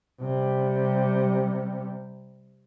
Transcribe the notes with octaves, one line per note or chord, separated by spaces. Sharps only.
C3 G3